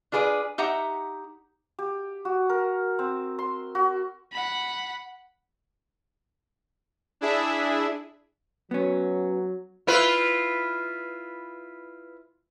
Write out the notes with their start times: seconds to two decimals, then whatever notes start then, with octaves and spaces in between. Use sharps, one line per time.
0.12 D4 F4 G#4 B4 C5 D5
0.58 D#4 G4 E5 F#5 A#5
1.79 G4
2.25 F#4
2.49 A#4
2.99 C4
3.39 C6
3.75 F#4
4.32 F#5 B5
7.21 D4 E4 G#4 E5
8.71 F#3 B3 C#4
9.87 E4 F4 B4